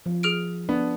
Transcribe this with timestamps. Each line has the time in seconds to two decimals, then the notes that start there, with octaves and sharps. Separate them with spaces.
0.06 F3
0.23 G#4 F6 D7
0.69 B3 D4